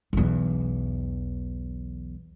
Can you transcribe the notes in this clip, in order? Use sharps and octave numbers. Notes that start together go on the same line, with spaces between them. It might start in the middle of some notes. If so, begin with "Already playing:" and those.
B1 E2